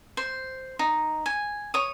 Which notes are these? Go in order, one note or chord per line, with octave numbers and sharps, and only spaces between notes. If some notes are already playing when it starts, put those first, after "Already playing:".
C5
D#4
G#5
C#5 D#6